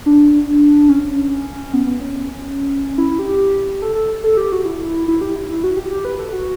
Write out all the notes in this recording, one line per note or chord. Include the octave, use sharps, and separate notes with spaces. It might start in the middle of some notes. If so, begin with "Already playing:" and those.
D4
C#4
B3
B3
C#4
E4
G4
A4
A4
A4
G4
F#4
E4
E4
G4
E4
E4
F#4
G4
G4
B4
A4
F#4